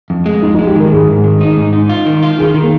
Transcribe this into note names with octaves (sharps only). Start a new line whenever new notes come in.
F2
G#3
F2 D#4
D#4
G#3
G4
D#3 A#4
G#2 G#4
G#2
D#3
D#4
G#2
D#4
F4
D#3
F4
D#3 G#4
D#3
A#3